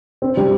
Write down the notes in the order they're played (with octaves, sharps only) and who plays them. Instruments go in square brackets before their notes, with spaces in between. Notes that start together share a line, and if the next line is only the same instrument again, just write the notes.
[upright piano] C4
G3